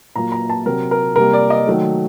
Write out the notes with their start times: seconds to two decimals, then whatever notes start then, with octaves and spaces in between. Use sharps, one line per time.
0.16 A#2 F#3 A#3 A#5
0.32 A#5
0.49 A5
0.66 C3 F#3 C4 A#4
0.91 A#4
1.16 C3 G3 A#3 A#4
1.33 D5
1.50 D#5
1.67 D#3 F#3 A3